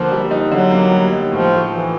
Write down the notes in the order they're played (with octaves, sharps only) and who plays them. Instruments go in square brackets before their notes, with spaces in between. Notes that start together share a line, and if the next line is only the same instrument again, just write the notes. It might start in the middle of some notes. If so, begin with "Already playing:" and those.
Already playing: [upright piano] D3 A#3 [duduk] F3
[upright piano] G3
D#4
[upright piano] D3 [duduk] F#3
[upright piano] A#3
G3
D#4
[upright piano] A2 [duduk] F3
[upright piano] A3
[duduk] E3 [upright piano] F3